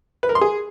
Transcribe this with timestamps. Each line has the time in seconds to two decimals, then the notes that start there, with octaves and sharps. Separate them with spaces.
0.23 B4
0.29 A#4
0.35 C6
0.41 G#4